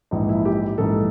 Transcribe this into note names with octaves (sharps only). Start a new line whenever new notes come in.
A#1 G#2 E3 D#4
E4
G4
A#1 G#2 E3 A4